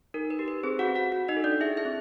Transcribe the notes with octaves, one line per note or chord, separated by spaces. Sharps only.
D#4 A#4
B4
G4
B4
C4 G#4 C5
F#4 F#5
C4
F#4 F#5
F#4
D#4 D#5
A4
D4 D5
E4 G#4 E5
E4 E5
C4